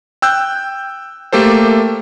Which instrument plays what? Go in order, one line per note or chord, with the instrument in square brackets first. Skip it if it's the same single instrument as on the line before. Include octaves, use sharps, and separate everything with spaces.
[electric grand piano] G5 E6 F#6 G6
A3 A#3 G4 A4 C5